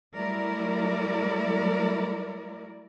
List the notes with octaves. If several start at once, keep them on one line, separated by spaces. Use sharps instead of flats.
F#3 G3 A3 E4 A#4 D5